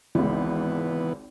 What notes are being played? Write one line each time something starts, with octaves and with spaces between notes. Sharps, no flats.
G#1 C#2 E3 B3